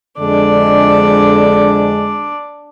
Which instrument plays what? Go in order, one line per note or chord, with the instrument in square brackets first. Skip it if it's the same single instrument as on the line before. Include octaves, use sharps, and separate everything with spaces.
[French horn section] F2 D3 G#3 [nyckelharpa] D4 D5